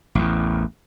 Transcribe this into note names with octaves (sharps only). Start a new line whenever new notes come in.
A1 E2